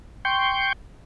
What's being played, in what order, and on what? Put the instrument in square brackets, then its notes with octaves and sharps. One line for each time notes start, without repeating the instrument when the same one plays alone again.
[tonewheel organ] G5 C6 C#6 G6